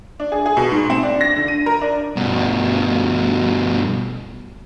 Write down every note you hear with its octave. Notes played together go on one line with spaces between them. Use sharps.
D4
G#4
G#4
B2
G#2
C4
D4
A#6
D3
D#7
A#4
D4
G2 B2